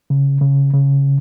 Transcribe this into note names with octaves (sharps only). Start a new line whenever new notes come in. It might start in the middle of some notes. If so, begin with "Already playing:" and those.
C#3
C#3
C#3